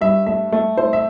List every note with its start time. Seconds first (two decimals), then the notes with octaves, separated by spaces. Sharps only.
0.01 G2 E5
0.26 A3 E5
0.52 A3
0.77 A3 C5
0.93 E5